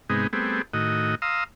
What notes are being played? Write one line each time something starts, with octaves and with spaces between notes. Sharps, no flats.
G#2 C3 G#3 B3 D#4
G3 A3 B3 C4 G#4
A2 D#3 F#4 D#5
F5 A#5 C6 D#6 E6